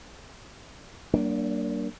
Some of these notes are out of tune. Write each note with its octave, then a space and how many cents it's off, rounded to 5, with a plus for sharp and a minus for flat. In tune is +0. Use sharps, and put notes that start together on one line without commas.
G3 -45 A#3 +0 D4 +0